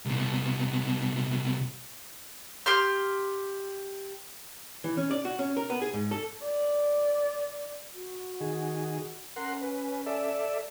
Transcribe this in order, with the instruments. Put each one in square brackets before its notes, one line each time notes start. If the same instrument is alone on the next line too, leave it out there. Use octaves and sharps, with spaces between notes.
[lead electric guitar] C2 B2
[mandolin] G4 C6 F6
[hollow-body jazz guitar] E3
C#4
D5
F#4
C#4
A#4
B3
G#4
G#2
A4
[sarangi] D5
[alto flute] F#4
[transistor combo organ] D#3 G#4
[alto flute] C#4 [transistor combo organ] A#4 F#5 C6
[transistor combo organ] B4
A4 D5 E5